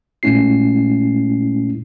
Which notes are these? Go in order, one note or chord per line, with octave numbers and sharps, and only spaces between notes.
A#2 G#3 A3 C#4 E4 C7